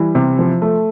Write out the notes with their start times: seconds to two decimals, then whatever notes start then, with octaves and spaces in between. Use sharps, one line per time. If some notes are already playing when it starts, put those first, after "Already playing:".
Already playing: E3 G3
0.15 C3
0.39 F3
0.62 A3